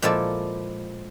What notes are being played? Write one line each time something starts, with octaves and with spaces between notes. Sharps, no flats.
A#2 F3 G#3 E4 A4 D5